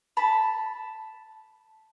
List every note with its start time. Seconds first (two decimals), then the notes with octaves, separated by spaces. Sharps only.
0.17 A5 B5